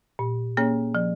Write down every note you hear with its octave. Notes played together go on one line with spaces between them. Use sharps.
A#2
A#3 C#4 G#4 C#5
F3